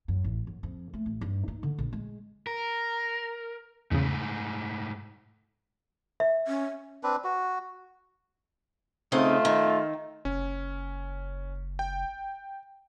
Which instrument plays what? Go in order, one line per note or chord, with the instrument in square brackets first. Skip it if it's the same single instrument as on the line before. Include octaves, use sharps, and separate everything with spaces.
[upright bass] F#2
A1
F#2
F2
A3
A1
G2
D#4
D3
A#1
G#3
[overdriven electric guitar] A#4
[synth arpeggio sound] E2 C#3 [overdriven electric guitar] G#2 A3
[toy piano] E5
[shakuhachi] C#4
[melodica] C4 D4 B4
F#4
[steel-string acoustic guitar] C#3 C4 D#4 [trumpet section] A3 F4
[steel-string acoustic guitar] D#3
[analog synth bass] F#1 [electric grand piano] C#4
[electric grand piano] G5